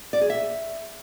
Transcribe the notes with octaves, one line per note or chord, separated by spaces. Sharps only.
D5
G#4
E5